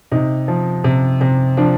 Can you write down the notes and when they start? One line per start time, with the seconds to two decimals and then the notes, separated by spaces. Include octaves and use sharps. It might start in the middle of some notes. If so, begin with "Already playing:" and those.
0.11 C3 D#4
0.48 F3
0.84 C3
1.21 C3
1.57 F3 D4